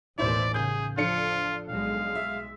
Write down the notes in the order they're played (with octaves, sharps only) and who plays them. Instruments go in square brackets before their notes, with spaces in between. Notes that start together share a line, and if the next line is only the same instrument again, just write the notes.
[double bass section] A1 D#2 B2 [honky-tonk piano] E4 C5 [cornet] D5
[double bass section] C#3 [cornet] G#4 [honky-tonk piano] G6
[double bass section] F3 [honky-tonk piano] D4 A4 C#7 [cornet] F4
[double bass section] B1 G#3 [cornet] F5
[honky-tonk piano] E5